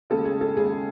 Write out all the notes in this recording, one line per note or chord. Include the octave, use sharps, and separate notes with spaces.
D#2 C#3 G#3 A4
G#4
A4
D#2 C#3 G#3 G#4